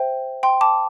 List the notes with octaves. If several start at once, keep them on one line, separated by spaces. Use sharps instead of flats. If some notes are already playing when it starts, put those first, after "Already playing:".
Already playing: C5 E5 G5
G5 C6
A5 D6